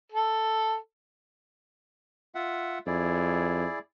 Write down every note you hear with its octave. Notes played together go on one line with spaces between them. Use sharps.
A4
F4 E5 F#5
F2 E4 G#4 D5